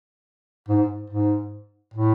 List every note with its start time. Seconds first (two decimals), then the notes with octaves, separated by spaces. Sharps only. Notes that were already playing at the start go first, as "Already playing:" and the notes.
0.69 G#2
1.10 G#2
1.94 A2